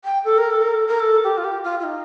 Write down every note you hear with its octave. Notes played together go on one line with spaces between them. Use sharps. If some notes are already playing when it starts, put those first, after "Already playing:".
G5
A4
A#4
A4
A#4
A4
A#4
A4
G4
F4
G4
F4
F4
D#4